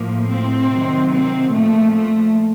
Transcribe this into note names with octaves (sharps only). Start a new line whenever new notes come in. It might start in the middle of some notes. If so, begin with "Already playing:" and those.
Already playing: A2 F3 A#3
C4
C3 D#3 F#3
C4
A#2 F3 A3
A3